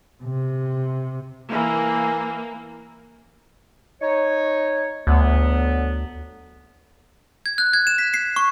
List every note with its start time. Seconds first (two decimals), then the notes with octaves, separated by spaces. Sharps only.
0.23 C3
1.52 E3 A#3
4.01 D#4 C#5
5.07 D2 D3 F#3 B3
7.46 G#6
7.58 F#6
7.73 G#6
7.87 E7
7.98 B6
8.14 C7
8.36 C#6